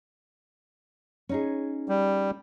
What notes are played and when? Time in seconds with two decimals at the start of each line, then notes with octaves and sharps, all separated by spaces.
1.29 C#4 D#4 G#4
1.89 G3